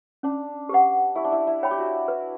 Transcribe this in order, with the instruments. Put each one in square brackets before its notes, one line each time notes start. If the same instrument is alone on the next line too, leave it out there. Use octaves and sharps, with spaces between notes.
[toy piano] C#4 [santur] D4
[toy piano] G4 B4 F#5
[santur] E4 [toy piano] G4
[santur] D4
E4
E4
[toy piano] C#5 G5 B5
[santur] G4
F#4
[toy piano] B4